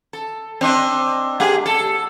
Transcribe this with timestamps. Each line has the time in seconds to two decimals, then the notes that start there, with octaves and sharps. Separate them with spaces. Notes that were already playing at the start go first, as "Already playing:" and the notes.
0.13 A4
0.61 C4 D4 D#5
1.40 A3 G4 G#4
1.66 A4